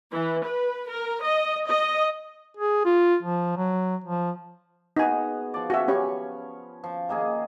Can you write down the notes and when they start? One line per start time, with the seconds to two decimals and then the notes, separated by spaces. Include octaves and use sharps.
0.11 E3
0.44 B4
0.89 A#4
1.24 D#5
1.69 D#5
2.57 G#4
2.85 F4
3.23 F3
3.57 F#3
4.04 F3
4.97 B3 D#4 F#4 G#4 G#5
5.54 F3 D5
5.70 C#4 F#4 E5
5.88 C#4 G4 C#5 B5 C#6
6.84 F3
7.09 D#3 A#3 G#4